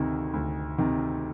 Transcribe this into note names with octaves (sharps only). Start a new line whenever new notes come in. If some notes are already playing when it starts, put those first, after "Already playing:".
Already playing: D2 C3 D#3
D2
C3 D#3